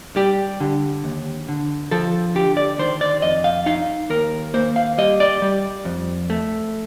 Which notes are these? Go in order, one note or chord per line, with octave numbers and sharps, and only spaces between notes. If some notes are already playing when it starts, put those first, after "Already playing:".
G3 G4
D3
D#2
D3
F3 A4
D3 G4
D5
D#3 C5
D5
F2 D#5
F5
D#4 F5
D#2 A#4
A#3 C5
F5
G3 D#5
D5
G3
F2
A3